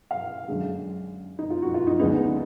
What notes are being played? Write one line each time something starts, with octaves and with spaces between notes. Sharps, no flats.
F5
F#2 D3 G#3
D#4
F4
F#4
F4
D#4
D2 D3 G#3 B3 D#4